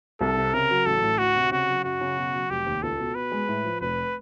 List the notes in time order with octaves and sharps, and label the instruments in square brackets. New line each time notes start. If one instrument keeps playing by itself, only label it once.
[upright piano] C2 [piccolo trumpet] A4
[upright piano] C3
[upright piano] C#3 [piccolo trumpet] A#4
[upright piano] F#3
[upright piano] A1 [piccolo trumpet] A4
[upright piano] A2
[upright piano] D2 [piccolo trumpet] F#4
[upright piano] C3
[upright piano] C#3 [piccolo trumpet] F#4
[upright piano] F#3
[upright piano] F#2 [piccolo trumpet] F#4
[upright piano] C#3
B2
F#3
[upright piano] F1 [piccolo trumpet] G4
[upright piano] D#2
[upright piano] C#2 [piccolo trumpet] A4
[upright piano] B2
[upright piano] B2 [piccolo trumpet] B4
[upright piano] G#3
A2
F3
[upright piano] F1 [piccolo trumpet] B4